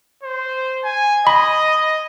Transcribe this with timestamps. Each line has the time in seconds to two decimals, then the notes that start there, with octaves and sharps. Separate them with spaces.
0.23 C5
0.84 G#5
1.27 D#5 B5